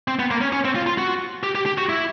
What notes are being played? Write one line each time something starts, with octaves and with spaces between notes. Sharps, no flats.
C4
B3
A#3
C#4
C#4
C4
F4
F4
F#4
G4
G4
G4
F#4
E4